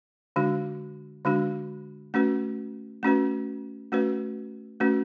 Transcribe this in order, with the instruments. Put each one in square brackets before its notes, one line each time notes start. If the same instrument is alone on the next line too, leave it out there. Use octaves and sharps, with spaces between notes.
[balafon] D3 G#3 D4 F#4
D3 G#3 D4 F#4
A3 C#4 F#4 B4
A3 C#4 F#4 B4
A3 C#4 F#4 B4
A3 C#4 F#4 B4